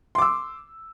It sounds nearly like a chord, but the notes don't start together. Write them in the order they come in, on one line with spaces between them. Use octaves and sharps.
C6 D6 E6